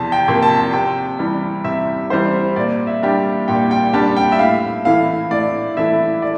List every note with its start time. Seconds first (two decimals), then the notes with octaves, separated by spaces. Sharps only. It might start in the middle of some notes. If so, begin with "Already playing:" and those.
Already playing: E2 C3 F3 A5
0.12 G5
0.28 C3 F3 A#3
0.42 A5
0.73 C3 G5
1.19 E3 G3
1.64 C3 E5
2.10 E3 G3 C5
2.56 A#2 D5
2.87 E5
3.02 G3 D4 G4
3.48 A#2 G5
3.71 G5
3.93 G3 D4 G4 A5
4.16 G5
4.32 E5
4.39 A2 F5
4.85 E3 A3 E4 F5
5.30 A2 D5
5.77 E3 A3 E4 E5
6.22 D5